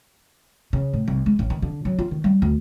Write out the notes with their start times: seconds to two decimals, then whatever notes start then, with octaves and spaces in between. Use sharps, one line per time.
0.73 C#3
0.93 A2
1.08 C2
1.26 G#3
1.39 A1
1.50 D#3
1.62 D3
1.85 F#3
1.99 F4
2.11 D#3
2.24 G3
2.42 D2